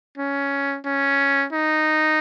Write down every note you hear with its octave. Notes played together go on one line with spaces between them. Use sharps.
C#4
C#4
D#4